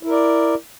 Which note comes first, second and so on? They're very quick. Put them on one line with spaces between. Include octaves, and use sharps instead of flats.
E4 A#4 D5